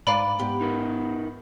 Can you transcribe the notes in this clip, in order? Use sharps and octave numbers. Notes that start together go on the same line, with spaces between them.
G#2 B4 D5 F5 A#5 B5
G#2 B3 G4
D#4 A#4 B4